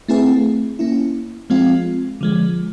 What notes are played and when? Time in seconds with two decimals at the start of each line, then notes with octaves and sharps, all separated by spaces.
0.08 A3 C4 E4 G#4 B4
0.79 A#3 C#4 E4
1.50 F3 G#3 C4 F4
2.21 D3 F3 G#3